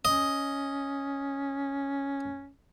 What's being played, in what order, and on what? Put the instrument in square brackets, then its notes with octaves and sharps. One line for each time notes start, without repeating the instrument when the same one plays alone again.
[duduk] C#4 [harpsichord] D#5